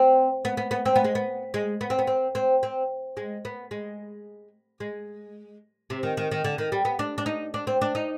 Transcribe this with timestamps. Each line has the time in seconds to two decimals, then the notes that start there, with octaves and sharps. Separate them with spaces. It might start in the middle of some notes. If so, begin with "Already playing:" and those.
Already playing: C4
0.45 B3
0.57 B3
0.71 B3
0.85 C4
0.96 B3
1.04 G#3
1.15 B3
1.54 G#3
1.81 B3
1.90 C4
1.99 B3
2.07 C4
2.35 C4
2.63 C4
3.17 G#3
3.45 B3
3.71 G#3
4.80 G#3
5.90 C3
6.03 D#3
6.17 D#3
6.31 D#3
6.44 D3
6.58 D#3
6.72 G3
6.85 B3
6.99 D4
7.18 D4
7.26 D#4
7.54 D4
7.67 C4
7.82 D4
7.95 D#4